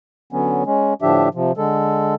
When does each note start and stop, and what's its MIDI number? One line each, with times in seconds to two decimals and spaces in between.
0.33 0.63 50
0.33 0.63 54
0.33 0.63 59
0.33 0.63 61
0.66 0.94 56
0.66 0.94 61
1.02 1.29 45
1.02 1.29 50
1.02 1.29 53
1.02 1.29 62
1.02 1.29 67
1.02 1.29 76
1.35 1.52 48
1.35 1.52 53
1.57 2.15 50
1.57 2.15 56
1.57 2.15 69